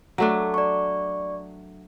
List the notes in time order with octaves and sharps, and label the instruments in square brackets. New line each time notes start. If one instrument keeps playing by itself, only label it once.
[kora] F#3 A3 D4
[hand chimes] D5 C#6